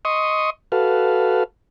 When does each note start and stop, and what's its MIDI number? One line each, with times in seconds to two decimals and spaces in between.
0.05 0.50 75
0.05 0.50 84
0.05 0.50 85
0.05 0.50 87
0.72 1.43 66
0.72 1.43 69
0.72 1.43 71
0.72 1.43 77